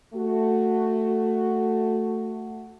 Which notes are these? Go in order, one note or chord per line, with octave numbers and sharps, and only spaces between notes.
A3 F#4